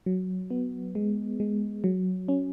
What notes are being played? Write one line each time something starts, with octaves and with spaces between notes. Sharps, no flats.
F#3
B3
G#3
G#3
F#3
C#4